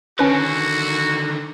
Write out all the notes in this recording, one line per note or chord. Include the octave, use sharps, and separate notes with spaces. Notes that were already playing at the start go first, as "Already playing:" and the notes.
D3 D#3 C#4 F#4 B4